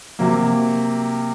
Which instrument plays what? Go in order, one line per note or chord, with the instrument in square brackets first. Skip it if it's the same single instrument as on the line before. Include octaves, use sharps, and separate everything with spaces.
[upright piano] C3 F#3 A#3